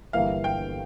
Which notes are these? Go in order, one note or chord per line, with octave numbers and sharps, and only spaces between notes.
G1 G2 E3 A#3 E4 F5
G5